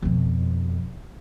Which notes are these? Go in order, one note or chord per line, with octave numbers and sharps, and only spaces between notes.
F2 B2